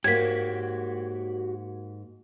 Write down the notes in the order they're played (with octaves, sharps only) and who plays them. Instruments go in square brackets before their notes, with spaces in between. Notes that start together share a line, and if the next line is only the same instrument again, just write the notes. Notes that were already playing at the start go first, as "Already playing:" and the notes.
[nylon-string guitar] G#2 A#3 [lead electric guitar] F#4 G4 [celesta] A#4 C#5 [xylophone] G#6 B6